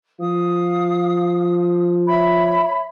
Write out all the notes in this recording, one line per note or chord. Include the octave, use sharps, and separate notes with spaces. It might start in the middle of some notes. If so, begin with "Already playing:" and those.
F3 F5 D#6
C#5 E5 B5